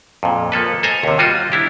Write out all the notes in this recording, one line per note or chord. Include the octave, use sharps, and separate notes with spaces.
F2 A#2
F3 A#3 A4 B4
A4 C5 D#5 G#5 A#5
D#2 C3
G3 F4 F#4 C#5 D#5
D4 E4 G4